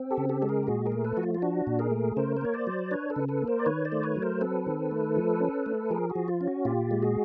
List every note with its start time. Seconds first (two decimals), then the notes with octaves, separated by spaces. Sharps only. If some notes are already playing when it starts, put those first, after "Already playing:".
Already playing: C4
0.11 G4 A4
0.17 C#3
0.29 G4 A4
0.42 G#3 A4
0.49 G#4 A#4
0.63 G4
0.67 A#2 F#4 G#4
0.85 G#4 A#4
0.92 A3
1.05 A4 B4
1.17 F3 F#4
1.23 F4
1.35 F4
1.42 D4 F#4
1.67 A#2
1.79 G#4 A#4
1.91 A3
2.16 C#3 A#4 C5
2.36 C5
2.41 A#3 C#5
2.54 C5 D5
2.67 F#3
2.91 D4 B4 C#5
3.10 A4 B4
3.16 C#3
3.28 A4 B4
3.42 A#3
3.47 A#4 C5
3.59 D5
3.66 D#3 B4 C#5
3.85 C5 D5
3.92 A3
4.03 B4 C#5
4.16 F#3
4.22 A#4 C5
4.41 C4 A4 B4
4.67 D#3
4.91 A3
5.17 F3
5.40 C#4
5.66 A3
5.90 F3 G#4 A#4
6.09 F#4 G#4
6.15 F3
6.28 F4
6.41 C#4
6.48 F#4
6.65 A#2 F4 G4
6.91 G#3
7.02 F#4 G#4